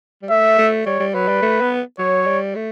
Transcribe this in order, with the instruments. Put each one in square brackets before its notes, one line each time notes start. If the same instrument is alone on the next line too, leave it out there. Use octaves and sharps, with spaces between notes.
[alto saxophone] G3
[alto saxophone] A3 [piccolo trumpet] E5
[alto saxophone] A3
[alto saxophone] G3 [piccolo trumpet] C#5
[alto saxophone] G3
[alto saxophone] F#3 [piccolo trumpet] B4
[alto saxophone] G3
A3
B3
[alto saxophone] F#3 [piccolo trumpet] C#5
[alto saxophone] G3
A3